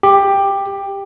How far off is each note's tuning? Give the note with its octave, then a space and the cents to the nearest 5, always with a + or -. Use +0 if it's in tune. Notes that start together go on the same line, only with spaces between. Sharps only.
G4 +10